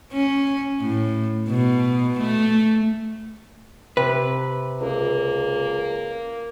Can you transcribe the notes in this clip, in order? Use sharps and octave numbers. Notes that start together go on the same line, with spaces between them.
C#4
A2
B2
A3
C3 B4
C#2 A#3